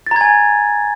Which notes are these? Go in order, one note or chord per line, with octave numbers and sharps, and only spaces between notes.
G#5 A#5 G#6 A6